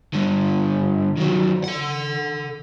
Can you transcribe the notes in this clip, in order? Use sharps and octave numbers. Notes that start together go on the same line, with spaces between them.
G2 D3
D#3 F#3
A4 F#5